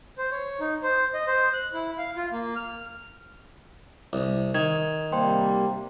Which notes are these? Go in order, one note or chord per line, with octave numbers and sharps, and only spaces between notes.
C5
C#5
D#4
C5
D#5
C5
F#6
E4
F5
F4
A#3
F6
C2
D#3 G#6
C3 G3 A#3 C5 G5 C6